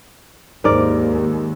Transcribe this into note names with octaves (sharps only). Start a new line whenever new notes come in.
D#2 G#2 A#4 D5